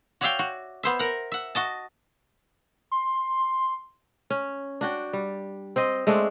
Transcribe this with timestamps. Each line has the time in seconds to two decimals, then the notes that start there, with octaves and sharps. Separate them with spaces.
0.21 F#4 C#5 D5 E5 F5 G5
0.39 F#4
0.83 B3 C5 E5
0.99 A#4 F#5
1.32 E5 F#5
1.55 F#4 D#5 A5
2.91 C6
4.30 C#4
4.81 D4 F#4 G5
5.13 G3
5.76 C4 C5 D#5
6.07 G#3 A3 C4 D4